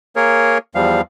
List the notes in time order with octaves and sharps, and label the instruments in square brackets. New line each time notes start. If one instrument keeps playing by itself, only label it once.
[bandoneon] A#3 G#4 A#4 C#5
E2 F3 G3 F5